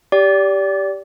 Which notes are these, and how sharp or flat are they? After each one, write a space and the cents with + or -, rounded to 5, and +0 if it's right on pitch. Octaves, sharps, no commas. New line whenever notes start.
G4 +0 D5 -25